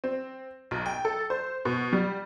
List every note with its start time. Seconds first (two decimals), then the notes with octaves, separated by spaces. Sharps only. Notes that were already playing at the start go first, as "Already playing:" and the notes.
0.04 C4
0.71 B1
0.86 G5
1.05 A4
1.30 C5
1.65 B2
1.93 G3